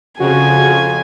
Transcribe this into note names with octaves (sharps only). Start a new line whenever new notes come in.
F2 C#3 F#4 G#5